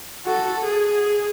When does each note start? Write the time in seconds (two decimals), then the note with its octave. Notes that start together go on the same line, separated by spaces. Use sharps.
0.26 F#4 A4
0.65 G#4